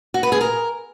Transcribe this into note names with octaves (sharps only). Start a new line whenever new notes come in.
F#4
B4
G#4
A#4